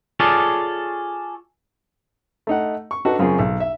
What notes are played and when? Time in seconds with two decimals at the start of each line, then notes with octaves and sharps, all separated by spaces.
0.20 F4 G#4 A4 C#5 D5
2.47 A3 D#4 F#5
2.91 C#6
3.05 D4 D#4 F#4 A4 B4
3.19 F#2 C#3 C4 F4 G#4
3.39 B1
3.60 E5